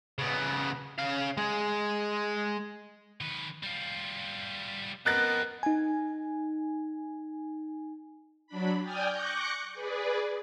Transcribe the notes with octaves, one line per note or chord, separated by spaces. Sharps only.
C#3 B3
C#3 F5
G#3 G#4
D#3 B4
G3 F4
F2 B3 A#4 D#5 F#6 A6 D7
D#4 G#5
F#3 D4 B5
D5 G5 G#5 D#6 F6 G6
C#6 D6 F#6 G6 A#6 C#7
G#4 B4 D5